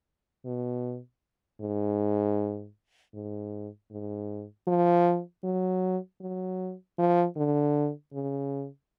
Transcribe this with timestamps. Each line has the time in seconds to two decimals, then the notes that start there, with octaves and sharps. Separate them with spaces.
0.46 B2
1.61 G#2
3.15 G#2
3.91 G#2
4.68 F3
5.44 F#3
6.21 F#3
6.99 F3
7.37 D3
8.13 C#3